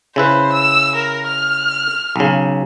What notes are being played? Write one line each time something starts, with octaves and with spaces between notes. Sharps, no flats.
C#3 E4 B4 C5
E6
A#4
F6
B1 C#3